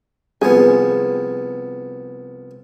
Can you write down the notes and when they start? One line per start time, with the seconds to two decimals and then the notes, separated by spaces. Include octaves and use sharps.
0.42 C2 F3 B3 G#4